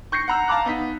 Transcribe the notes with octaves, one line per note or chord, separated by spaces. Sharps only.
C#6 G6 A#6 C7 C#7
F#5 A#5 E6
F5 A5 A#5 D6 F#6
B3 D#4 B6